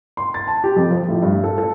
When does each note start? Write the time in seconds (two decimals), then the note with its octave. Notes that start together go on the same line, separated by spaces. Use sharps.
0.17 C6
0.34 A6
0.47 A5
0.64 G4
0.76 F2
0.91 F3
1.08 A2
1.22 G2
1.44 A4
1.58 A4